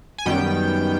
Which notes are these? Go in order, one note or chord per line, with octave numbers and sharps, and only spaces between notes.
G#5
F#2 D#3 G3 B3 G5